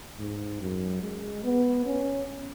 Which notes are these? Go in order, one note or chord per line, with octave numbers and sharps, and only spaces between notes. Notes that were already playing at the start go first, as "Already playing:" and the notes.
G#2
F#2
G#3
B3
C#4